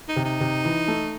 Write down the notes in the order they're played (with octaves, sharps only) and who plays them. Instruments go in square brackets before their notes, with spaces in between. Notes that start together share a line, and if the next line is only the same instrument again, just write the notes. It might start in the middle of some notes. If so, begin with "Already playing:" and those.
[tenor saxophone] D#4
[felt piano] C3
[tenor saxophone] D#4
[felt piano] C3
E3
A3